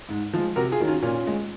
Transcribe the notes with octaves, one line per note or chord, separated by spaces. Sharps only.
G#2
F3 G#3
C3 F#4 A#4
F4 G#4
D#3 F#3
C#4 F4
A#2 C#4 F4
G#3